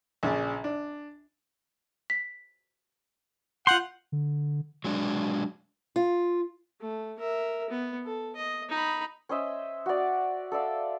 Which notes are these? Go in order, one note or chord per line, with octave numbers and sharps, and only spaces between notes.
A#1 C#3 D5
D4
B6
F4 F#5 C6 G6 F#7
D3
F#3 G#3 D4
F4
A3
A#4 E5
B3
A4
D#5
D#4 B5
C#4 C5 D#5 E5
F#4 D5
A4 D5 E5 F5